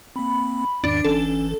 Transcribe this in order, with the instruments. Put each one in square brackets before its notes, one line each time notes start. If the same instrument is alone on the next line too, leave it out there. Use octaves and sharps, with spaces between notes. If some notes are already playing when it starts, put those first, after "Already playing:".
[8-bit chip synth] A#3 C4 [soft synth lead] B5
[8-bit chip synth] E2 G#2 D#3 [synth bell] D4
[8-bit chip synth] G1 E3 [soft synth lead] C#4 [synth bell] A4
[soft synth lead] C#4